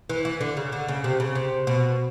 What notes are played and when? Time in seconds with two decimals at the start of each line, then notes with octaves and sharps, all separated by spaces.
0.10 E3
0.25 E3
0.41 D3
0.57 C#3
0.72 D3
0.88 C#3
1.04 C3
1.20 C#3
1.35 C3
1.67 B2